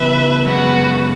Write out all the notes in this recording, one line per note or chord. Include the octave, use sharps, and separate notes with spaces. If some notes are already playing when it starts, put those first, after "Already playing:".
Already playing: C#3 E3 B3 B4 E5
F#2 C#3 G#3 B3 F#4 B4